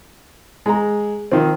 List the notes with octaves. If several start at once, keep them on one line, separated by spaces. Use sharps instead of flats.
G#3 A#5
D#3 F3 C4